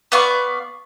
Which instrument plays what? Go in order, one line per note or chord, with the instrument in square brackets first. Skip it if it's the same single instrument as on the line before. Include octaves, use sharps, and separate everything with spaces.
[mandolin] B3 D5 F5 C#6